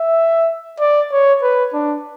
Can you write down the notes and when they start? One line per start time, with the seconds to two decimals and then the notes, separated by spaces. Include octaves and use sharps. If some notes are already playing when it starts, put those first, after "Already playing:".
Already playing: E5
0.80 D5
1.12 C#5
1.42 B4
1.74 D4